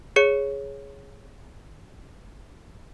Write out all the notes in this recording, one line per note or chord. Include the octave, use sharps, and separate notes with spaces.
G#4 C#5 C#7